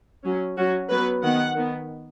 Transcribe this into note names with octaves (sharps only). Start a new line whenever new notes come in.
F#3 C#4
F#3 C#4 F#4
F#3 B3 B4
D#3 B3 F#5
D#3 B3